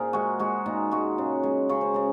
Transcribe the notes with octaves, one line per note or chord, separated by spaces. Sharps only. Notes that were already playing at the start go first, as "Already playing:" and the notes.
Already playing: A#2 G#4 A#4 C5
G#3 F#4
G#3 F#4
A#2 D#4
G#3 F#4
C#3
G#3
C#3 C#5
C5
C#3 A#4